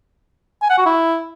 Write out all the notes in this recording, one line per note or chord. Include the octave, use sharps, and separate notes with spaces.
G#5
F#5
F#4
E4